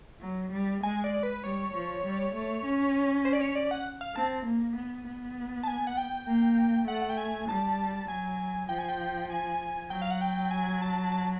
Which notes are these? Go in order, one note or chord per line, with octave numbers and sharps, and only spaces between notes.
F#3
G3
G#3 G#5
D5
B4
G3 C#5
F3
G3
A3
C#4
C5
D5
C#5
D5
F#5
F5
C4 A5
A#3
B3
B3
A5
G#5
F#5
G5
A#3
A3 F#5
F#5
G5
G#5
G3 A5
F#3 G#5
F3 G5
G#5
G5
G#5
F#3 G5
F5
F#5
G5
G#5
A5
A5